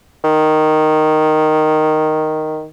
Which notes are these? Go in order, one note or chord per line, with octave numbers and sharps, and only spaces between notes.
D#3